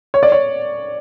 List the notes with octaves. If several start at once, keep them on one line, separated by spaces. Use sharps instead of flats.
C#5
D5
C#5